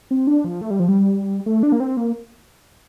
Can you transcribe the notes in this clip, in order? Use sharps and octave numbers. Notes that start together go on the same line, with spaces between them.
C4
D4
F3
A3
G3
F3
G3
A3
D4
A#3
C4
A#3